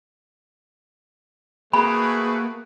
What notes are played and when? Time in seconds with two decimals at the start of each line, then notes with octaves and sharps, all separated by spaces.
1.73 A3 A#3 F#4 G#4 B4 B5